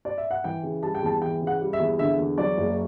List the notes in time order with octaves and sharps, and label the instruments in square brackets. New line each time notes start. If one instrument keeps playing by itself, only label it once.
[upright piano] D5
E5
F#5
E3 G5
C#3
G3 A5
G5
E2 A5
E3 G5
C#3
F#5
G3
E5
E2
D3 E5
E2
F#3 D5
F#1